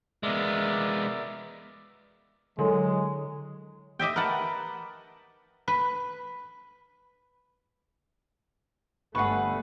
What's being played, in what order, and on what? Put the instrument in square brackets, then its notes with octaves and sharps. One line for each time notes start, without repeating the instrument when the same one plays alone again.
[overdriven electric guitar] G#3 B3 [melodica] A#4 D5 E5
[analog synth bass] D3 [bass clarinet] F#3 [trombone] G#3 [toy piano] E4 A4 A#4
[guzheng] G4 D#5 E5 G5
A#4 B4 F#5 A5
B4
[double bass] G1 A3 [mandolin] G#4 B4 [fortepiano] F#5 C#6